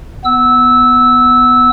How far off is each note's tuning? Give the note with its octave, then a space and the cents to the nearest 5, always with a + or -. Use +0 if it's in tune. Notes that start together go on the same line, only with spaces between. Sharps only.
B3 +0 E6 -15